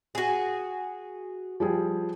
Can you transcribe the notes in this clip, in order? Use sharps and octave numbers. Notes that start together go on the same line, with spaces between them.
F#4 G#4
F3 G3 G#4